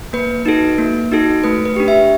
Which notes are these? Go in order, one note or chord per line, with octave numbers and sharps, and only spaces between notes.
A#3 B4
D#4 F#4 A4
A#3
D#4 F#4 A4
A3 B4
B4
D4 G4
E5